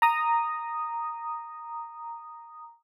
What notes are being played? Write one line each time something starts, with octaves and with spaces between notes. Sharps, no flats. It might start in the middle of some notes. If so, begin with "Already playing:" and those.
A#5 D#6